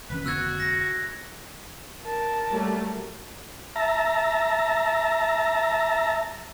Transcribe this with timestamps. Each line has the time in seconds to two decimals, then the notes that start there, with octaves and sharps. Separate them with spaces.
0.10 F#1 D#3 C#4 B4
0.26 F1 D3 B3 F#4 E6 F#6 G#6
0.60 A#6
2.03 A#4 A5
2.52 F#3 G3 A3
3.76 E5 A5 A#5